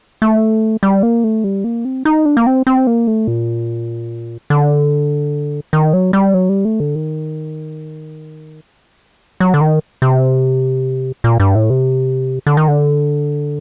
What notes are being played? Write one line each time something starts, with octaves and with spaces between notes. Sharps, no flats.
A3
G3
A#3
A3
G3
A#3
C4
D#4
D4
A#3
C4
C4
A#3
A3
A#2
D3
D#3
F#3
G3
F#3
G3
A3
D3
D#3
F#3
D3
D#3
C3
A#2
G2
A2
C3
D3
D#3
D3